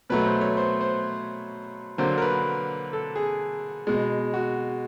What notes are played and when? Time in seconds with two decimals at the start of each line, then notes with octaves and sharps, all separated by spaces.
0.10 B2 F#3 A3 B4
0.26 C5
0.41 C#5
0.57 C5
0.81 C5
1.98 D3 F#3 A#3 C5
2.18 A#4
2.22 B4
2.93 A4
3.16 G#4
3.87 B2 G#3
4.34 F#4